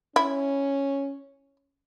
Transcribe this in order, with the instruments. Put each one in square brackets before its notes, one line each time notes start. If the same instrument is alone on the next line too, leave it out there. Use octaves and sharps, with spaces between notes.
[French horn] C#4 [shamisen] E4